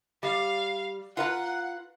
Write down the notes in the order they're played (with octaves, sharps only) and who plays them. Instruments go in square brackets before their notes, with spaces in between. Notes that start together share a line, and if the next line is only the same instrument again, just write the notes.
[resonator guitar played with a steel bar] G3 [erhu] F5
[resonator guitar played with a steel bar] F4 B4 A#5 [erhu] F#5